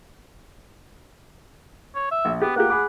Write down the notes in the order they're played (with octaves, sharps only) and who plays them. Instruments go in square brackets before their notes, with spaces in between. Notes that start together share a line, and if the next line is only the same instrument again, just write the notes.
[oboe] C#5
E5
[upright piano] A#1
[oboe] B3 [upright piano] G4
[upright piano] A#3 F4 G4 [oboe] F#5
[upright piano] G#4 B5 D6